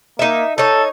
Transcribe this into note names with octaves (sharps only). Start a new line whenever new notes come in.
A#3 D#4 E5
D#4 A4 C#5